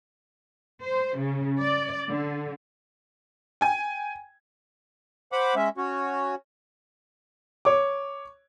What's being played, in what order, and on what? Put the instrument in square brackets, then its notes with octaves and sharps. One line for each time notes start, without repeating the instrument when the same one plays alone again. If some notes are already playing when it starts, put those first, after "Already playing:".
[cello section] C5
C#3
D5
D3
[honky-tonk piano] G5 G#5
[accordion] C5 F#5 B5 D6
G#3 C#4 E5
C#4 F#4 C#5
[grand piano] C#5 D6